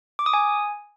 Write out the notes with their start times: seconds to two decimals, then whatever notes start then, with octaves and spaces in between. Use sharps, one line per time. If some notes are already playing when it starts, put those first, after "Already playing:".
0.19 D6
0.26 D#6
0.34 G#5